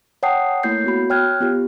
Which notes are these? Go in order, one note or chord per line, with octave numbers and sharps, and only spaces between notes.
C#5 F#5 G5 A5 D#6 C7
A3 A#3 E4 C#5 G6 C7
B3 F#4 B5
C#5 G5 F6 F#6 G#6
B3 F4 G4